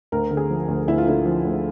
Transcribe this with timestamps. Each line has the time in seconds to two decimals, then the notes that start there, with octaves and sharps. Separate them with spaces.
0.12 D2 A#4
0.31 D3
0.37 G#4
0.50 F3
0.68 D2
0.87 D2 E4
0.98 F4
1.06 D3 E4
1.26 F3
1.45 D2